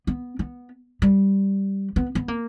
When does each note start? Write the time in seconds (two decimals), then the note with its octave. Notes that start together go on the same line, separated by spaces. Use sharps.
0.07 B3
0.39 B3
1.02 G3
1.96 B3
2.15 B3
2.28 A#3